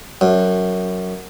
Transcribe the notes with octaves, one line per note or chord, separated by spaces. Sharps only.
F#2